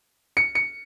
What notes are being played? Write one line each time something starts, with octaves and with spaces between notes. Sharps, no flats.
C#7
C#7